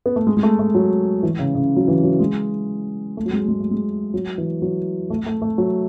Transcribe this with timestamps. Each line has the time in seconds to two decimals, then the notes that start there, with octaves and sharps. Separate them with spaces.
0.06 B3
0.16 A3
0.27 G#3
0.37 G#3
0.43 A3
0.59 A3
0.75 F#3
1.23 E3
1.39 C#3
1.55 C#3
1.76 F#3
1.88 E3
2.03 F#3
2.20 G#3
3.17 A3
3.26 F#3
3.33 G#3
3.48 G#3
3.60 A3
3.71 G#3
4.14 F#3
4.38 E3
4.62 F#3
5.10 A3
5.26 A3
5.42 A3
5.58 F#3